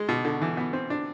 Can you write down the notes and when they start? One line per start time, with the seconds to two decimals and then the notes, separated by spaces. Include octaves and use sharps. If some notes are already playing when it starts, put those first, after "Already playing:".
Already playing: G#3
0.09 B2
0.25 D3
0.42 E3
0.57 B3
0.73 C4
0.90 D4